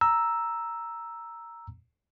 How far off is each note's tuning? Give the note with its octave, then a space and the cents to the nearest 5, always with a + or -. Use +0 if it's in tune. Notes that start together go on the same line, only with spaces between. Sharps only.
A#5 +0 E6 +0